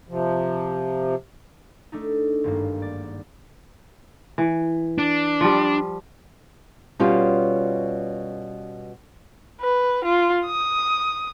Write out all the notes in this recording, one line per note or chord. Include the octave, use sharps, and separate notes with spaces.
C3 F3
A3 D4 D#4
G#1 G2 A#3
D5
E3
D4
F3 G3
B2 G3 C#4 F4
B4
F4
D#6